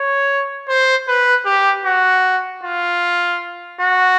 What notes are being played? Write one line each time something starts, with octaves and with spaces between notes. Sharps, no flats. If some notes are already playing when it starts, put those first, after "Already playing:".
Already playing: C#5
C5
B4
G4
F#4
F4
F#4